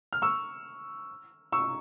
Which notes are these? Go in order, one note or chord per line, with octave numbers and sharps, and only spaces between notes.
F6
C#6 E6
C#6 E6